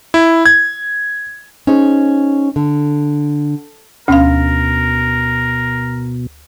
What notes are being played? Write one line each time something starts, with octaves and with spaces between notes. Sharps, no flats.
E4
G#6
C#4 D#4 G#4 C5
D3
D2 B2 C#4 A#4 F5 C6